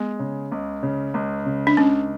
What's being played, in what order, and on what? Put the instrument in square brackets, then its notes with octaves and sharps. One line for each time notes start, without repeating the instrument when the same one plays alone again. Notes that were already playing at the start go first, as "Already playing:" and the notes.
Already playing: [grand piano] G#3 [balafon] B3
[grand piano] C#3
C#2
C#3
C#2
C#3
[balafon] D4
[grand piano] C#2 [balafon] C#4